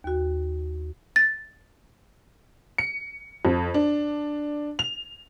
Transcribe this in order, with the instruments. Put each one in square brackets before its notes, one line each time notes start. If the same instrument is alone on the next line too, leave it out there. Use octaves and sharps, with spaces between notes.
[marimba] D#2 F#4
[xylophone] A6
[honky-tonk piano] C#7
F2
D4
F7